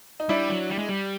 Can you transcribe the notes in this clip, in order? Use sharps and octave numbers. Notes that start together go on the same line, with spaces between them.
D#4
G3 D4 E4
F#3
G3
G#3
G3